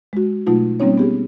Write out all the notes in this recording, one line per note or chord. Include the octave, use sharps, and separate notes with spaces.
G#3 F#4
B2 F#3 A3 D#4 F4
G3 A#3 C4 C#4 D#4 C#5
B3 G4 G#4